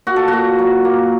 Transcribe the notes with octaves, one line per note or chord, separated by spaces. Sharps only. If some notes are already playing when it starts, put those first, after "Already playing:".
A#2 F#4
A4
F#4
A#2
F#3
A#3